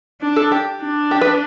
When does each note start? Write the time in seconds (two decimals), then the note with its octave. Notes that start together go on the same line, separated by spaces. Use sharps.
0.21 D4
0.36 A4
0.52 G4
0.82 D4
1.11 G4
1.21 B4